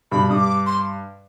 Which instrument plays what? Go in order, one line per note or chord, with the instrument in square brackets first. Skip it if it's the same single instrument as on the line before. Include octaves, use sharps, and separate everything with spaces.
[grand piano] G2 B2 [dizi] B5
[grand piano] G2 [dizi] D#6
[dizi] D6
C6